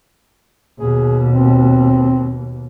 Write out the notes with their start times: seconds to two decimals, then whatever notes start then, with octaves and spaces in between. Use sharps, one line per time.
0.80 D#2 B2 G#4
1.32 C4